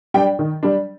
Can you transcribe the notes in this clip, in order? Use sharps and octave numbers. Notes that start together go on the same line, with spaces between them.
G3 D4 G5
D#3
G3 D4